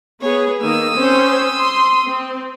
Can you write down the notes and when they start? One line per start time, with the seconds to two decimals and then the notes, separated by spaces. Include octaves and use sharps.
0.21 B3 G#4 C#5
0.62 D#3 A#3 D#6 E6
0.96 C4 C#4 C5
1.58 C6
2.07 C4